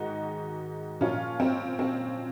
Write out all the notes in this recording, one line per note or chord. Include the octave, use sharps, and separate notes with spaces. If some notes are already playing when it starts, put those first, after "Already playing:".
Already playing: G#2 D#3 D#4 F#4
A#2 F3 C#4 F4
C4
C4